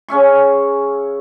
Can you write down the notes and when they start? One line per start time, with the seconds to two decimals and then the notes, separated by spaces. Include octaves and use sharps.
0.08 C#3 C#4 E5 C#6